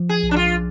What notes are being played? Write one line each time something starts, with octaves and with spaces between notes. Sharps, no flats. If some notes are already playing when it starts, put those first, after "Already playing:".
Already playing: F3
G#4
B1
D4
F4